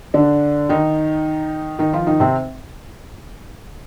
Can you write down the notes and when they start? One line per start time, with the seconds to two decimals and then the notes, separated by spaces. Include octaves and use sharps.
0.14 D3 D4
0.69 D#3 D#4
1.79 D#3 D#4
1.93 F3 F4
2.07 D#3 D#4
2.20 C3 C4